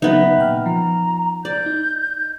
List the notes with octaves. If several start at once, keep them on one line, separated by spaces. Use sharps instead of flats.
C#3 F#3 B3 D#4 E5
A#2 G5 F6
F3 A#5
D5 G6
D#4